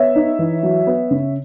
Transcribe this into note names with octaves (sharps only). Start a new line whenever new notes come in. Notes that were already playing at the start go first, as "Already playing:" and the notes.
Already playing: B3 C#5 E5
D#4
E3
F#3
B3
C#3